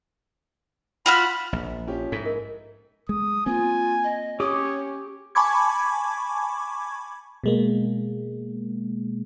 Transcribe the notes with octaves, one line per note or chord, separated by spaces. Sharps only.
F4 F#4 B5 F6
A#1
F3 C#4 G4
G#2 E4 A4 B6
A#4 D#5
G#3 D#6
A#3 C4 F4 G#5
D#5
C#4 G4 C#5 D6 D#6
G#5 A5 B5 C#6 D6 G#6
B2 G#3 A#3